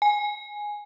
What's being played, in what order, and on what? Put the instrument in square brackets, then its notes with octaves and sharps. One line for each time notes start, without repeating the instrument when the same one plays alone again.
[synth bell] G#5